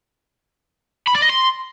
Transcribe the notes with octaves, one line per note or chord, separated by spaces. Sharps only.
B5
D5
D#5
C6